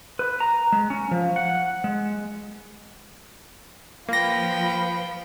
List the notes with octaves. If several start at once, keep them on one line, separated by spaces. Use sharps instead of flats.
B4
A#5
G#3
C#4
F3
F#5
G#3
F3 A#3 B4 F5 G5 B5 A#6